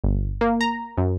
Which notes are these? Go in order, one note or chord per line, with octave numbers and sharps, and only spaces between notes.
G1
A#3
A#5
F#2